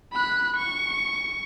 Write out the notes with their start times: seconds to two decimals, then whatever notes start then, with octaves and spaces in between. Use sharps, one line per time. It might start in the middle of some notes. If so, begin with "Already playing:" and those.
0.13 B5 F#6
0.56 C#6